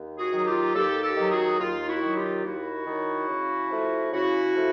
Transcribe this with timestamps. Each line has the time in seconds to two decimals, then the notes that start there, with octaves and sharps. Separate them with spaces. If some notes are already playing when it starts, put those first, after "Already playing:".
Already playing: D#2
0.18 F#4 G#4
0.33 D#3 F#3
0.46 F4 G4
0.75 D#2 G4 A4
1.03 G4 A4
1.17 D#3 F#3
1.31 F#4 G#4
1.60 D#2 F4
1.87 E4 F#4
2.02 D#3 F#3
2.16 F4 G4
2.44 D#2 E4 F#4
2.86 D#3 F#3
3.29 C#3
3.71 F3 A3
4.13 C#3 E4 F#4
4.56 F3 A3